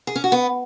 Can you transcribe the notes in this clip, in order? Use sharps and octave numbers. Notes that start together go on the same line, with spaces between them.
G#4
C#4
F#4
B3